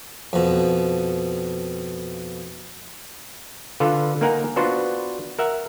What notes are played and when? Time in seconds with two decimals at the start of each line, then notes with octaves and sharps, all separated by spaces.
0.33 F2 B2
3.80 D3 F4 A4 B4 F5
4.21 A#3 D#4 A#4 F#5 G#5 A#5
4.56 B3 D4 F4 F#4 B4 C5
5.39 A#4 E5 F#5